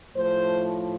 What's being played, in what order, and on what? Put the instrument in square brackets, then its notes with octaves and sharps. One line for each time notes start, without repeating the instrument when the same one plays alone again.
[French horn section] A2 F3 A3 C5